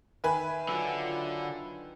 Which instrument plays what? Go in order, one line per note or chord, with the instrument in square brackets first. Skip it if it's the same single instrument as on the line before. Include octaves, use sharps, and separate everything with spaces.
[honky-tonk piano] D#3 B4 G#5 [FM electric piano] E5 B5
[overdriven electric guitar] D3 [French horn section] F#3 F4